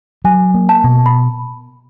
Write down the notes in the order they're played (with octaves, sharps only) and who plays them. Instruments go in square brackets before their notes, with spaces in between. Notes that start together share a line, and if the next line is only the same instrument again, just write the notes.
[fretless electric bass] F#3 [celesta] G#5
[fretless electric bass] A#3
[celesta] A5
[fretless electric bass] B2
[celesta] B5